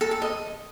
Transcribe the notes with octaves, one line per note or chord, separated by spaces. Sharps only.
A4
A4
D#5